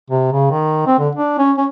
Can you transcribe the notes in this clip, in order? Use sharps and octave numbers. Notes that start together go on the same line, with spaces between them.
C3
C#3
D#3
C4
D3
D4
C#4
C#4